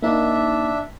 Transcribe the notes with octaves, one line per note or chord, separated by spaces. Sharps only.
A#3 D4 D#4 E5